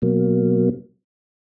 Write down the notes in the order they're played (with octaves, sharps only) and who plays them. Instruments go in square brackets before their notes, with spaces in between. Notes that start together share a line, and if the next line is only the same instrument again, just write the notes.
[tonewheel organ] B2 F#3 A#3